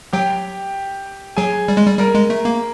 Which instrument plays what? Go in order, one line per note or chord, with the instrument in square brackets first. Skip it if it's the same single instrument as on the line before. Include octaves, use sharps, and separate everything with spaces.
[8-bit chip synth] F#3 [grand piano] G4 G5
[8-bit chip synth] F#3 [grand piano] G#4 G#5
[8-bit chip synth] G3
G#3
G3
[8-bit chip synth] G3 [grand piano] A#4 A#5
[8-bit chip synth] G#3
A3
A#3